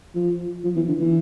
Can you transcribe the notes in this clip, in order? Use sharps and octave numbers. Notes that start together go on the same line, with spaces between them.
F3
F3
E3
D3
E3